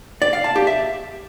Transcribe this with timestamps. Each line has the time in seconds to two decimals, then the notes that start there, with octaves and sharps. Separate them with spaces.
0.22 D5
0.33 F5
0.44 A5
0.56 G4
0.67 E5